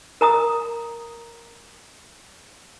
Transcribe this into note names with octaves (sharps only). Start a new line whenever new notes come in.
A#4 A#5 D#6